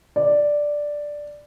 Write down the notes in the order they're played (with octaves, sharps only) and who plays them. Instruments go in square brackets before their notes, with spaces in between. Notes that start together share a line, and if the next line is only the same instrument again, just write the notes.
[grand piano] D5